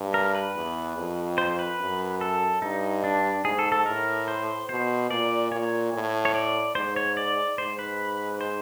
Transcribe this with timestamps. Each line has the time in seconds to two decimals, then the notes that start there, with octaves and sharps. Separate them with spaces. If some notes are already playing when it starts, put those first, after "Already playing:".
Already playing: G2
0.14 A#4
0.35 B4
0.55 E2
0.97 F2
1.38 C5
1.59 B4
1.80 F#2
2.21 A4
2.62 G2 D#4
3.04 D4
3.44 G#2 G#4
3.59 A4
3.72 A4
3.86 A2 A#4
4.28 C5
4.69 B2 C5
5.10 A#2 D5
5.51 A#2 C#5
5.93 A2
6.25 C#5
6.34 D5
6.75 G#2 C5
6.96 C#5
7.17 D5
7.58 G#2 C5
7.79 B4
8.41 C5